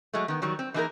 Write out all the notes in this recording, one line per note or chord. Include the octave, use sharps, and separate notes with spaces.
F#3 G#3 A3
D#3 B3
D#3 F#3 G3
C4
E3 A#3 D#4 G4 G#4 A#4